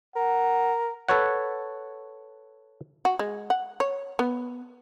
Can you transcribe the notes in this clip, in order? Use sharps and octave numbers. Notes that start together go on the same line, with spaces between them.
A#4 F#5
A4 B4 C#5 F#5
F#4
G#3
F#5
C#5
B3